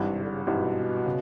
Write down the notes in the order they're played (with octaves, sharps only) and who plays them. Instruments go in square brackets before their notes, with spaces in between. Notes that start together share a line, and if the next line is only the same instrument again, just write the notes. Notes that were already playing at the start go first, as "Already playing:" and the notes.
Already playing: [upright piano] G#1 G2 E3 G3
[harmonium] C3
D3
C#3
[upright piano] G#1 G2 E3 G3 [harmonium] B2
[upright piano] C#3